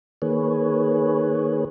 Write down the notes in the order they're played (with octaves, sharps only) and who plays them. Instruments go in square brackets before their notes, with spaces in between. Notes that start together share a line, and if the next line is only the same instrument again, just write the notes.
[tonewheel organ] D#3 A#3 G#4 B4 C#5